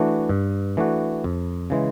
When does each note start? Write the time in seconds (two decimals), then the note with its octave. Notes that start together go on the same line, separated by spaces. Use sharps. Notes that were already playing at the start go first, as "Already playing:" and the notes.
Already playing: E3 A3 D4 F#4
0.29 G2
0.77 E3 A3 D4 F#4
1.24 F2
1.70 C#3 E3 G#3